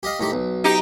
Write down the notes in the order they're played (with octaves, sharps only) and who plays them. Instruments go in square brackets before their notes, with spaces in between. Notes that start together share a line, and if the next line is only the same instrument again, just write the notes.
[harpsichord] G4 D#5 F5
A2 D#3 G4
B1
[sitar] D#4 G4